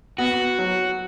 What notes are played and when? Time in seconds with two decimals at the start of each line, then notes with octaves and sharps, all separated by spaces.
0.18 B3 F#4
0.59 F#3